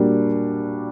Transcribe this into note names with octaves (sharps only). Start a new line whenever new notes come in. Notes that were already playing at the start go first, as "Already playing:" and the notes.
Already playing: A#2 G3 A#3 D4 F#4